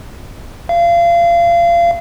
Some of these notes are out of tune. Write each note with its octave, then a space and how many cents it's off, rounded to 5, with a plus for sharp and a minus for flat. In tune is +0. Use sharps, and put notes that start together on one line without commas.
F5 -30